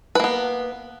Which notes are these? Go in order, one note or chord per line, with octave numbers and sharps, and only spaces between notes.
A#3 B3 B4